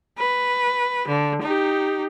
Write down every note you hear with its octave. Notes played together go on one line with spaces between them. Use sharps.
B4
D3
D#4 G4